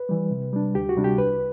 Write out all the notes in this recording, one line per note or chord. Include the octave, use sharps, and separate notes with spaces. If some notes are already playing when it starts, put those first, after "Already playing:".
Already playing: B4
E3 G3
C3
G3 D4
D2 G4
F#4
C3 G3 D4
G4
C2 B4